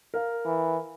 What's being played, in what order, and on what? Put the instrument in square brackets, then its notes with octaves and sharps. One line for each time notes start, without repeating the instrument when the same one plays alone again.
[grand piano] A#4 F5
[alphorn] E3